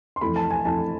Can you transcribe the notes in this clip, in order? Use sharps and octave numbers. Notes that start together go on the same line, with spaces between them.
C6
F2 E3 A3 B5
A5
G#5
F2 E3 A3 A5